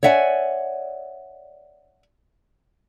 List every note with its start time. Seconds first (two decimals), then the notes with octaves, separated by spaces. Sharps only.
0.03 C#5 D5 E5 F#5 G#5